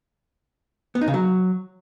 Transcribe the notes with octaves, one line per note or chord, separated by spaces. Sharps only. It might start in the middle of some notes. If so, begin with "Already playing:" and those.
B3
D#4
C#3
F#3